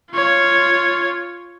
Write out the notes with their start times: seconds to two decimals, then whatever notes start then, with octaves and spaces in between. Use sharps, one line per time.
0.12 F4 C#5